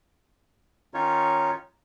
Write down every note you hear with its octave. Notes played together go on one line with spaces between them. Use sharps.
D#3 C#4 D#4 F4 C#5